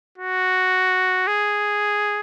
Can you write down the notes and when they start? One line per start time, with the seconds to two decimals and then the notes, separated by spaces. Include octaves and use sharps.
0.18 F#4
1.27 G#4